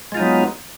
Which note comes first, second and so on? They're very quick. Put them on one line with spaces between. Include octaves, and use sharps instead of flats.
G#3 F4 D#4 F#3 B3